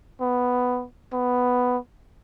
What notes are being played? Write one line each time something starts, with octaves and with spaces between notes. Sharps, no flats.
B3
B3